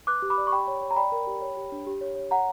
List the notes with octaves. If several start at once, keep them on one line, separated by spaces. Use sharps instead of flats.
B4 D6 F#6
G4
B5 D6
D5
C#6
G4 G5 B5
C#5
C#5
A#5
D5 G5 B5
A#4
G4
C#5
G4
D4
G4
C#5
C#5
C#5 F#5 A#5